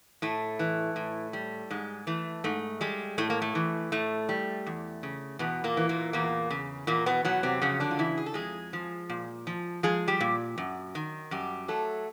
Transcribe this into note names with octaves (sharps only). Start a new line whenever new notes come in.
A2 A3
E3
A2
G3
G#2 G#3
E3 A3
G#2 A3
G3 G#3
A2 A3
A#3
A3
E3
A2 A3
G3
E2
C#3
E2 B2 B3
A#2 A#3
E3
A#2 A#3
E2 A#2 A#3
C#3
E2 A#2 A#3
B2 B3
B2 F#3 B3
C3 C4
F2 C#3 C#4
D3 D4
F4
C#3 E3 E4
G#4
A4
F2 G#3 G#4
F3
A#2
F3
F3 G#3 G#4
G3 G4
A#2
F#2
D#3
F#2 G3 G4
F#3 A3 A4